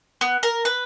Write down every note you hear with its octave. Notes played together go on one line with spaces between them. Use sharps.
B3
A#4
B4